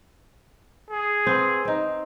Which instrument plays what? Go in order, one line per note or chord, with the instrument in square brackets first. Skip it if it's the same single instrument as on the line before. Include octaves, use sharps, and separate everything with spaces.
[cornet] G#4
[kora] B3 C4
C4 D#4